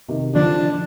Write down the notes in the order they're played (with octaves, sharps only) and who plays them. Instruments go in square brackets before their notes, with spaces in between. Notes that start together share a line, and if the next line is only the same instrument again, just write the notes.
[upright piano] C3 D#3
[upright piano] D3 F3 [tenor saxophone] D4